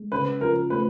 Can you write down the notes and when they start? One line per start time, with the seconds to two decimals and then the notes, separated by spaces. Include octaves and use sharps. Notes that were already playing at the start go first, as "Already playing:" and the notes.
Already playing: G#3
0.12 C#3 B4
0.41 F3 A#4
0.70 A3 B4